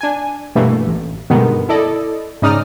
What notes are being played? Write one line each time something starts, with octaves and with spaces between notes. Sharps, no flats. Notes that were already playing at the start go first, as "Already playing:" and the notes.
D4 G#5
G2 B2 E3 A3 A#3
A1
G2 B2 D3 D#3 G#3 B3
E4 A4 D5 D#5
G#2 C#3 D#4 D5 D#6 F6